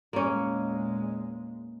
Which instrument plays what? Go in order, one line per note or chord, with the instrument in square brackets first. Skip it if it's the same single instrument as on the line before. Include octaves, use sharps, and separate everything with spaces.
[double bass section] E2 A#2 G#3 [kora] A#3 C#4